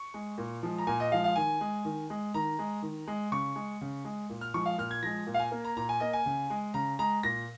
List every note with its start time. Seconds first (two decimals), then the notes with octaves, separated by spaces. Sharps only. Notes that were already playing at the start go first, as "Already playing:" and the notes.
Already playing: C#6
0.14 G#3
0.38 A#2
0.63 F3 G#3
0.78 A#5
0.87 A#2 G#5
1.00 D#5
1.12 F3 G#3 F5
1.24 F5
1.36 D#3 G#5
1.61 G#3
1.85 D#3
2.10 G#3
2.34 D#3 A#5
2.59 G#3
2.82 D#3
3.07 G#3
3.32 C#3 C#6
3.56 G#3
3.81 C#3
4.05 G#3
4.30 A#2
4.41 F6
4.54 F3 G#3 C#6
4.66 F5
4.78 A#2 F6
4.91 G#6
5.02 F3 G#3 A#6
5.27 A#2
5.34 F5
5.39 G#5
5.52 A#3
5.64 A#5
5.77 A#2 A#5
5.89 G#5
6.00 A#3 D#5
6.13 G#5
6.26 C#3
6.50 G#3
6.74 C#3 A#5
6.99 G#3 A#5
7.23 A#2 A#6